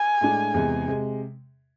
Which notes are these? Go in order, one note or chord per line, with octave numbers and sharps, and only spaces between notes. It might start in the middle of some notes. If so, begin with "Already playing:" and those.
Already playing: G#5
A2 G#3 D4
E2 C3 G#3
C3 G#3